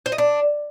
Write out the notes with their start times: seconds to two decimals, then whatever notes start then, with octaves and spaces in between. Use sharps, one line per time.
0.06 C5
0.12 D#5
0.18 D4